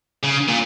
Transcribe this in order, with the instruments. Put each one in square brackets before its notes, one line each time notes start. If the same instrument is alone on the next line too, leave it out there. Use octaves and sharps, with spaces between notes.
[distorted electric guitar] C#3
A#2